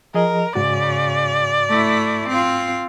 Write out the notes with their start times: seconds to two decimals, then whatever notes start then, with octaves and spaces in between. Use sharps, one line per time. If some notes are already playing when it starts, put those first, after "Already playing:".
0.14 F3 G#4 A#4 D#5
0.56 G#2 C#3 F#4 D5
1.69 A3 E4
2.28 C4 F4